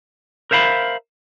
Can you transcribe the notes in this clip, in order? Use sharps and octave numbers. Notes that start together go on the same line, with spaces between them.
A#4 C5 E5 F5 B5